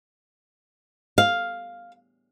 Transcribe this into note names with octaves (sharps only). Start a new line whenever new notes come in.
F5